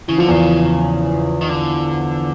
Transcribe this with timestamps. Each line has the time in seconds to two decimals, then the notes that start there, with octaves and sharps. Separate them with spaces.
0.08 C#3 E3
0.18 D3 F3
0.28 E2 C#3 E3
1.41 D#3
1.49 D3